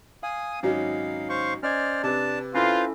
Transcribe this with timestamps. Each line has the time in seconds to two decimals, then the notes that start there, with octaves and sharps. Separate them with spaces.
0.23 F5 G#5 D#6
0.63 G#1 F#3 C#4 D#4 D#5 F5
1.29 C5 F5 C#6
1.63 C#4 C5 D5 D#5 F6 G#6
2.03 C3 D4 G4 B4 A5
2.55 C#4 E4 F4 A4 B4 C5 F5